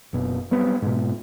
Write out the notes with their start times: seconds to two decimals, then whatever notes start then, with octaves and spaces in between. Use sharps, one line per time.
0.13 F#1 B2
0.51 F#3 G3 B3 C4
0.82 G#2 B2